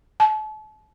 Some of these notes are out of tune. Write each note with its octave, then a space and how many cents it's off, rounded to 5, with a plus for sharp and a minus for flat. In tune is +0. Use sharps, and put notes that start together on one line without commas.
A5 -40